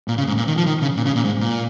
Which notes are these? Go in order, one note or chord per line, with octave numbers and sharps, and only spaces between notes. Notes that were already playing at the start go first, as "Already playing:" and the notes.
A#2
C#3
G#2
A#2
D#3
F3
D#3
C#3
A#2
C#3
A#2
G#2
A#2